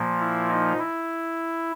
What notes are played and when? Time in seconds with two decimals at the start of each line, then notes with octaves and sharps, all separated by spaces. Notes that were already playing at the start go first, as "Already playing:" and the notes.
Already playing: A#2 F3 A#3
0.20 E4
0.49 D#4
0.79 E4